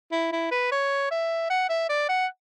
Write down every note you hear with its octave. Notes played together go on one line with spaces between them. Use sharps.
E4
E4
B4
C#5
E5
F#5
E5
D5
F#5